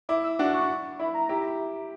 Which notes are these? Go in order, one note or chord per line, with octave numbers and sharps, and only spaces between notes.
E4 D6
E6
D4 F#4 D6
C#6
E4 B5
A#5
E4 G4